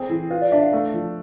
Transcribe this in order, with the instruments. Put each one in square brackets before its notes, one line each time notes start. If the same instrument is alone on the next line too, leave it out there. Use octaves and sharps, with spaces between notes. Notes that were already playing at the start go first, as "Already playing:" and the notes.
Already playing: [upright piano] C4 G#4 [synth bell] A4
[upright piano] E3
[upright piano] F4 [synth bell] B4
[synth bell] D5
[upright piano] D4 [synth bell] E5
[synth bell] F5
[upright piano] A3
F3